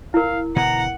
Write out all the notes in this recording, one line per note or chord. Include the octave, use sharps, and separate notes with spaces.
E4 A#4 F5
B2 D3 E3 F#5 A#5